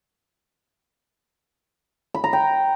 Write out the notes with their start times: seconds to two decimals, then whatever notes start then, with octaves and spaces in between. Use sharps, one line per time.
2.14 B5
2.24 A#5
2.33 G5